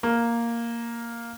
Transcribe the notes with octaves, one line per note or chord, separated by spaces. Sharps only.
A#3